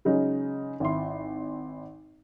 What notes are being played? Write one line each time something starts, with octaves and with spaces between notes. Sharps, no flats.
C#3 F#3 G#3 D#4
G#1 E4 C6